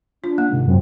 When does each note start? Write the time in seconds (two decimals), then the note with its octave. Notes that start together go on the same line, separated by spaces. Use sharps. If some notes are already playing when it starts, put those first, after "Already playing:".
0.24 D4 F4
0.38 A#3
0.51 G#2 C3 D#3 G#3
0.68 F#2 C4